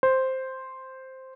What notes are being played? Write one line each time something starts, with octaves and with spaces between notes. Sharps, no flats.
C5